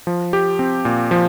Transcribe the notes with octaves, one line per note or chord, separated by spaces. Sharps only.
F3
G4
C4
A#2
F3